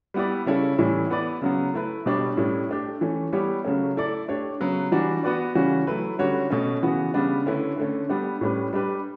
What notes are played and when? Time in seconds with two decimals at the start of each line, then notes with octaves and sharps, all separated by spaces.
0.14 G3 B3 E4 G4 D5
0.46 C#3 G3 C#4 E4 A4
0.78 A2 E3 G3 C#4 E4
1.10 B3 E4 B4 D5
1.41 C#3 F#3 B3
1.74 A3 E4 B4
2.06 B2 G3 D4 G4 C#5
2.37 A2 G3 C#4 E4
2.69 A3 D4 G4
3.01 E3 A3 C#4
3.33 G3 B3 E4 G4 C#5
3.65 C#3 F#3 A3 C#4
3.96 A3 E4 A4 D5
4.28 A3 D4 G4 C#5
4.60 C#3 F#3 B3
4.92 E3 G3 D4 F#4
5.23 B3 F#4 B4 D5
5.55 C#3 E3 G3 C#4 F#4
5.87 F#3 A3 E4 B4
6.19 D3 G3 C#4 F#4 C#5
6.50 B2 A3 C#4
6.82 C#3 E3 B3 F#4
7.14 C#3 G3 B3 D4
7.46 D3 A3 C#4 E4 B4
7.78 D3 A3 C#4
8.09 G3 B3 D4 G4
8.41 A2 G3 C#4 G4 B4
8.73 G3 D4 G4 B4